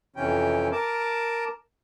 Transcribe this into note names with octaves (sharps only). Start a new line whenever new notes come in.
F2 C3 E3 C#4 G5
A#4 A5 D6